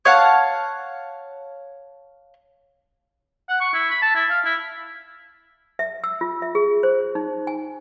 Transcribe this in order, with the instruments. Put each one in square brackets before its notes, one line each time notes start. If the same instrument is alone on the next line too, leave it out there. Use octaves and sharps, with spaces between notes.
[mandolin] C#5 F5 F#5 A5
[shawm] F#5
C#6
E4
B5
A5
E4
F5
E4
[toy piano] E5
E6
F4
E5
G#4
C5
D#4
G#5